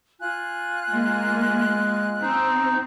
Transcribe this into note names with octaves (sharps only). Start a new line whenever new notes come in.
F4 G#5 F#6
G#3 A#3
C4 D#4